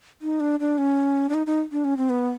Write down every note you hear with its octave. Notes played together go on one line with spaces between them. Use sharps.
D#4
D4
D4
C#4
D4
D#4
D#4
D4
C#4
C4
B3